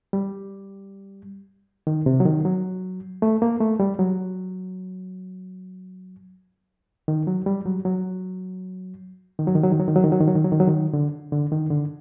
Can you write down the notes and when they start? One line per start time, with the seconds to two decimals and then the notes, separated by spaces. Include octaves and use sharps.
0.13 G3
1.87 D#3
2.06 C3
2.20 F#3
2.26 D#3
2.45 F#3
3.22 A3
3.42 A#3
3.60 A3
3.80 G3
3.99 F#3
7.08 D#3
7.27 F#3
7.46 G3
7.65 F#3
7.85 F#3
9.39 D#3
9.47 F#3
9.55 D#3
9.64 F#3
9.72 D#3
9.80 F#3
9.88 D#3
9.96 F#3
10.04 D#3
10.12 F#3
10.20 D#3
10.28 F#3
10.36 D#3
10.44 F#3
10.52 D#3
10.60 F#3
10.68 D#3
10.93 D3
11.32 D3
11.52 D#3
11.71 D3